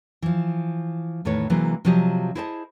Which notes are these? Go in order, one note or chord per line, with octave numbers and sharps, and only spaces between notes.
E3 F3
E2 A2 D#3 B4 C#5
C3 E3 F#3 G#3 A#3
C3 F3 F#3 G4 D#5
E4 G#4 C5 D#5 F5 A5